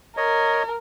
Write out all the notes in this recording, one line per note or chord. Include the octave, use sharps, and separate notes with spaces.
A#4 C#5 D#5